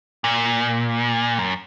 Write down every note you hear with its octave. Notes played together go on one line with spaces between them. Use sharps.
A#2
F#2